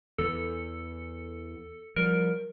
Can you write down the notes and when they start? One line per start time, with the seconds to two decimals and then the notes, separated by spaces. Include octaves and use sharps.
0.18 E2 E3 A4
1.96 F3 G3 A#4